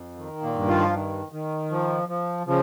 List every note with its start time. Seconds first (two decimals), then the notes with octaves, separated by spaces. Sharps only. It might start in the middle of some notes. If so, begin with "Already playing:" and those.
Already playing: F2
0.17 D#3
0.42 A#2 A#3
0.55 G2
0.67 F3 F4
0.93 D#3
1.32 D#3
1.70 F3
2.09 F3
2.47 C#3 F3